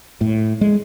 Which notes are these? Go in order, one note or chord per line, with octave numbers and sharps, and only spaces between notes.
A2
G#3